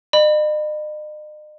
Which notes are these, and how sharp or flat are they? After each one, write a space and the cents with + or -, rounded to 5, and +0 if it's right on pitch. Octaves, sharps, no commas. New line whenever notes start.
D#5 -45 B5 +0